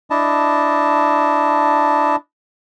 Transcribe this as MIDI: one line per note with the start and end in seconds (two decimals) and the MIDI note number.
0.10 2.16 62
0.10 2.16 64
0.10 2.16 75
0.10 2.16 81